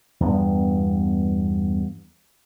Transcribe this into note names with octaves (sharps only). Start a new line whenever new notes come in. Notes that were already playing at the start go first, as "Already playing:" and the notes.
E2 G2 B3